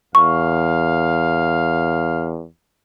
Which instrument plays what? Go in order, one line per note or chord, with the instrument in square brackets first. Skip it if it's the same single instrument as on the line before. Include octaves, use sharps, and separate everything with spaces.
[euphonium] E2 [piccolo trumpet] F5 [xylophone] C#6